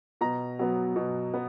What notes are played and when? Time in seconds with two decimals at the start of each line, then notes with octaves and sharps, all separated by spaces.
0.21 B2 A#5
0.59 F#3 B3
0.96 B2
1.34 B3